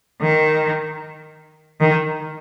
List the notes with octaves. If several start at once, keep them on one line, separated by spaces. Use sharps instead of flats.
D#3
D#3